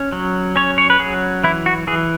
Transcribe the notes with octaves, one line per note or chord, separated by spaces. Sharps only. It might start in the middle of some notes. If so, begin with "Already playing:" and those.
Already playing: C#4
F#3
C#4 C#5
C#5
B4
F#3 G#4
E3 E4
F#4
E3 G#4